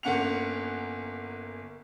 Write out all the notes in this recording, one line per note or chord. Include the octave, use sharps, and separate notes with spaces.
G1 A#3 C#4 F#5 C#7 F7